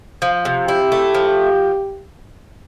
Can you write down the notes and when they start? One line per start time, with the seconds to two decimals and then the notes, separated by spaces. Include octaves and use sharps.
0.22 F3
0.45 C3
0.68 E4 G4
0.92 A3
1.15 F3